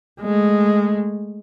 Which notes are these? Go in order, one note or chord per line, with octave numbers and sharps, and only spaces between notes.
G#3 A3